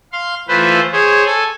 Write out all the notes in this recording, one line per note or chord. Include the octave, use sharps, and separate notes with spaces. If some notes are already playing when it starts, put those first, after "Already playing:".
F5 C6
E3 A3 F4 B4 C5
G#4 C5 C#5
A4 G#5